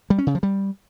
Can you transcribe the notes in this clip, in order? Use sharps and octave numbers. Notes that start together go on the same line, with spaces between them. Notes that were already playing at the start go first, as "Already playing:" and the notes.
G3
C#4
C#3
F3
G3